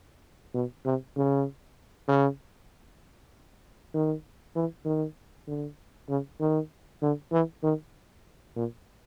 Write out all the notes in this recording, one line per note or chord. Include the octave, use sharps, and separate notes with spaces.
B2
C3
C#3
C#3
D#3
E3
D#3
D3
C#3
D#3
D3
E3
D#3
A#2